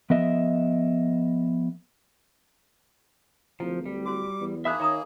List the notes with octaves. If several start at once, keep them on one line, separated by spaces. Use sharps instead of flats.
F3 B3 A#4 D#5 E5
D1 F3 E4
G3
F#4 C5 D6
E2
A#3 D#4 G#4 E5 B5 E6 F#6
D#3 C#5 D#5 E5 A#5 D#6